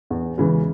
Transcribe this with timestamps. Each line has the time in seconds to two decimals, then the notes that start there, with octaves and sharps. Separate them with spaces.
0.10 E2
0.38 C#3 E3 G#3